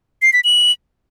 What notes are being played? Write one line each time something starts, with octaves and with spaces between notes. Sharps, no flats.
C7
B6
F#7